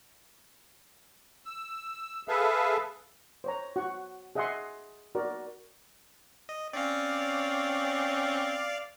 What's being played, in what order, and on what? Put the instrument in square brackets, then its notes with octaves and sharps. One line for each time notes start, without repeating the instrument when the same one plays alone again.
[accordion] E6
G#4 A4 B4 E5 F5
[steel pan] C5 C#5 A#5
F#4 F#5 C#6
G#4 D#5 E5 F#5 G#5 C6
F#4 A#4 D5
[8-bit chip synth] D#5
[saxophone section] C4 C#4 [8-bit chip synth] D5 F5